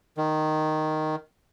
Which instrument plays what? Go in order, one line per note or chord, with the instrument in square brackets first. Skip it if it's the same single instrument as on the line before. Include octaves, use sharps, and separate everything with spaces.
[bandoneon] D#3